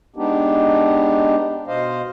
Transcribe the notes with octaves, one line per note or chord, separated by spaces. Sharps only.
G#3 B3 D4 D#4 G4
B2 C5 D#5 F5